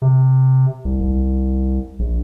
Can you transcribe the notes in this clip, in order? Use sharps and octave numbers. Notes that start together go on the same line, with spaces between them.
C3
C2
C2
A#1